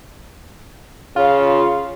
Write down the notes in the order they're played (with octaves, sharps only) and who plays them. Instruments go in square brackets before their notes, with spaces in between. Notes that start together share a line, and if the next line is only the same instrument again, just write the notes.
[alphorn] C#3 [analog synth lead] F4